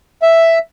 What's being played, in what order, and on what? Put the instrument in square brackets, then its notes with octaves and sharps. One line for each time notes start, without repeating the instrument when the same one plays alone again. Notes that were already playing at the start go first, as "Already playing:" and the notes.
[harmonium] E5